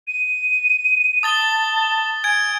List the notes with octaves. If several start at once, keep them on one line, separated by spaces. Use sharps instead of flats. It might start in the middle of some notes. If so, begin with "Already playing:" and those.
D#7
A5 D#6 A6 G7
G#5 G#6 D7